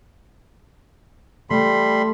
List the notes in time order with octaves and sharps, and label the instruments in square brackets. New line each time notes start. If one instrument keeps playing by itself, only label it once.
[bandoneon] G3 B5 C6 [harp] A3